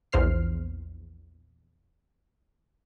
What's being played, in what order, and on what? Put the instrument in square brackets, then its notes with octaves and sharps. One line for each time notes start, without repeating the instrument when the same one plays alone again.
[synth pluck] A#1 E2 C5 F6 C7